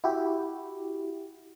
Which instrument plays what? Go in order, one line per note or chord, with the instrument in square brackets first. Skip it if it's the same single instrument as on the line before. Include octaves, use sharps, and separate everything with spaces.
[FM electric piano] E4 F#4 G4